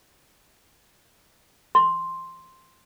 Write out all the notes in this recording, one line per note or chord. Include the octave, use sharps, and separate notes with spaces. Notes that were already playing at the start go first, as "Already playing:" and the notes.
C6